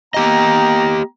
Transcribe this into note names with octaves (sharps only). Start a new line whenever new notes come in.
A#3 B3 G4 D#5 G5 A#5